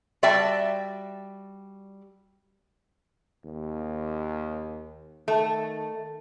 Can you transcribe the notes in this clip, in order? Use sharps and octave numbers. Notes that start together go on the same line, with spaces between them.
G3 F#4 D5 E5 G5 A5
D#2
D#3 A3